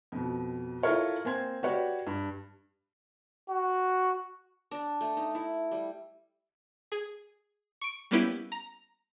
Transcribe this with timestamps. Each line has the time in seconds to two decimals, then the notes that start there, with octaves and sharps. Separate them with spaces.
0.12 F2 B2
0.83 E4 F4 A4 A#4 C#5 F5
1.25 A#3 C4 G#5 C6 G#6
1.63 F#4 G4 B4 C#5 D5
2.07 G2
3.49 F#4
4.71 D4
5.01 A3
5.17 D#4
5.35 E4
5.71 G3
6.92 G#4
7.81 C#6 D7
8.11 G3 A#3 B3 C#4 E4 G4
8.52 A#5